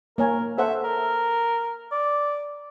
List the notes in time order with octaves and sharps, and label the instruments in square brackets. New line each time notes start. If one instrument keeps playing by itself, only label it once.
[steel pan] A#3 C#5 G#5 [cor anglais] A#4
[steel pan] A4 C5 F#5 [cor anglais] E5
[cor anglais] A#4
D5